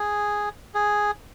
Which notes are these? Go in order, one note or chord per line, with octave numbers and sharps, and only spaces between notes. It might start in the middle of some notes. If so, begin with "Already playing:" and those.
Already playing: G#4
G#4